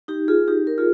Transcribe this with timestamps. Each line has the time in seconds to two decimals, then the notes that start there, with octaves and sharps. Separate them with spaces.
0.08 D#4 G4
0.28 F4 G#4
0.48 D#4 G4
0.67 A#4
0.78 F4 G#4